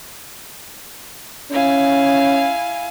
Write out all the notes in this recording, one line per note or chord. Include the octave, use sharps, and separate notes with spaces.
C#4 E4 F5 G#5